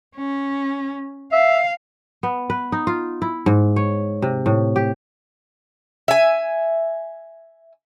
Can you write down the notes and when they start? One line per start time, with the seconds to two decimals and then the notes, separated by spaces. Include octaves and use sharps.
0.16 C#4
1.32 E5 F5
2.23 B3
2.50 B4
2.72 D#4
2.87 F4
3.22 E4
3.46 G#2
3.76 C#5
4.22 C3
4.46 A2
4.76 G4
6.08 E5 G#5